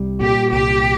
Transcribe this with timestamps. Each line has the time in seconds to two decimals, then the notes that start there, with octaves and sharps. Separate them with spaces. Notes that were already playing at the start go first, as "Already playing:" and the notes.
Already playing: C2 G3
0.21 A#2 G4
0.52 C2 G4